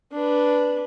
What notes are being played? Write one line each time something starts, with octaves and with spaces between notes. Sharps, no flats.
D4 B4